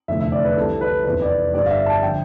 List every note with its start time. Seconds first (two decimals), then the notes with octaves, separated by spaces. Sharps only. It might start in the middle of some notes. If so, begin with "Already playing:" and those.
0.08 F1 E2 D3 F3 A3 E5
0.20 E5
0.32 D5
0.44 B4
0.57 C2 C3 E3 G3 A4
0.81 B4
1.05 F1 E2 C3 B4
1.22 D5
1.53 G1 G2 D3 G3 D5
1.66 F5
1.70 E5
1.86 A5
2.02 D3 F3 G5